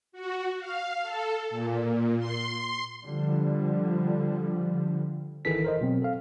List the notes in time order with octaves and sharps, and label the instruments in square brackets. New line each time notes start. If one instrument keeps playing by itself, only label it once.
[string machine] F#4
F5
A4
A#2
C6
[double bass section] D3 F3 G3
[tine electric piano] G1 D#3 E3 G#4 A4 B6
A#4 C5 D#5
B2 F#3 C4
A4 F5